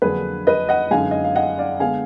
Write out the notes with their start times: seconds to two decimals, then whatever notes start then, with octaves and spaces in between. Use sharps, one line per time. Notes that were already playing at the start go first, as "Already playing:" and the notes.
0.02 F2 D3 F#3 A#3 D4 G#4 B4
0.47 B4 D#5
0.69 D#5 F#5
0.91 F#2 D3 G#3 D#4 F5 G#5
1.11 D#5
1.24 F5
1.36 D#5 F#5
1.58 D5 F5
1.80 D3 G#3 B3 F5 G#5